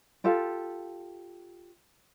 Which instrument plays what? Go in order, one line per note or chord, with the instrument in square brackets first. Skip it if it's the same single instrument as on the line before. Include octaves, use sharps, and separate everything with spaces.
[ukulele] F4 G4 A4 F5